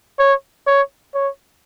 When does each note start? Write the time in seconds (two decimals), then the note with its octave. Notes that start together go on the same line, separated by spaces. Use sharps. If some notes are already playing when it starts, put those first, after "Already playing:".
0.19 C#5
0.67 C#5
1.14 C#5